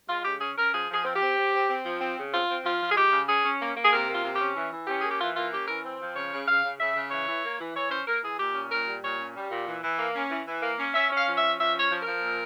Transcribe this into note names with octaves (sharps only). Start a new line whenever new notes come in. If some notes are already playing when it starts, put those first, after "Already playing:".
G#3 F4
C#3 G4
C#4 G#4
C#4 A#4
F3 G#4
F3 G#4
C4
G4
C4
C4
C4
C4
F3
C4
C#3
C4 F4
C4
F3 F4
F3
G#4
G#3 G4
C#3
C#4 G#4
C#4
A#3
A#3
G#4
C3 A#4
A#3 F4
C3
G4
C#4
E3
E3
C#4 G4
A#3 G#4
G4
E3 F4
A#3 F4
C#4 G4
E3 A#4
C4
F3
C#3 C#5
C#3
C#3 F5
C#3
C#3 E5
C#3
E3 C#5
E3
A#3
E3
E3 C#5
C#4 C5
A#3 A#4
E3 G#4
A#2 G4
C#4
A#2 A#4
G3
A#2 C#5
C#4
G3
A#2
E3
E3
A#3
C#4
E3
E3
A#3
C#4
C#4 E5
C#4
F5
F3
E5
C#4
F3 E5
C#4 C#5
F3
F3 A#4
A#2